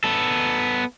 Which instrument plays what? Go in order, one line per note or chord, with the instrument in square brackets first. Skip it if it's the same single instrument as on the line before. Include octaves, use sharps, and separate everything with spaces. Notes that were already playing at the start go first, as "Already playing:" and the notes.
[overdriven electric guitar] B3 A4